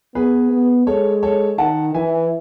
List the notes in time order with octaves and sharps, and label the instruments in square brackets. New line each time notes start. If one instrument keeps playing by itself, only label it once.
[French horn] B3 [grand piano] G#4 B4
[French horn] B3
[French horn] G#3 [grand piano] A4 C#5
[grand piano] A4 C#5
[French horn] D#3 [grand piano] F#5 A5
[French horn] E3 [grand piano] E5 G#5